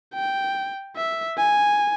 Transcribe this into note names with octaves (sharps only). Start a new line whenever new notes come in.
G5
E5
G#5